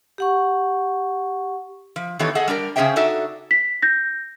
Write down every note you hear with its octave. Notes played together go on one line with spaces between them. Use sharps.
G4 F#5 C#6
F3
D#3 E3 B3 G4 A4 C#5
G#4 A4 D#5 F#5
G3 D4 G4 A#4
C#3 C#4 G#4 C5 E5 G5
D4 D#4 F#4 A4 E5
B6
G6 A#6